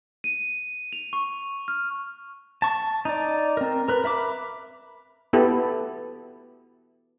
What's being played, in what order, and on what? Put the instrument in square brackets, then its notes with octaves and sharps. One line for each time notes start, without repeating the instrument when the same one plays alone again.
[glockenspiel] D#7
F7
C#6
F6
[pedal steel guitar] A5 C#6
D#4 D5
C4 A#4
A#4 B4
A#4 E5 B5 D6
[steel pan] B3 E4 G4 A4